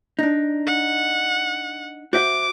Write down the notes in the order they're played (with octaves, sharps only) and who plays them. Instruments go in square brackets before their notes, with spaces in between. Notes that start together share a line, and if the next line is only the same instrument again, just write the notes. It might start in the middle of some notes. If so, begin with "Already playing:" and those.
[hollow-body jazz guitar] D4 D#4
[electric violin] F#5
[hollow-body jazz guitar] F#4 C5 E5 [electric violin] D6